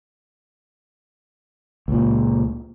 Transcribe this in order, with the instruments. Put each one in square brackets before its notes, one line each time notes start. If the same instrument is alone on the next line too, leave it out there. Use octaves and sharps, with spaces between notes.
[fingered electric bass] C#2 A#2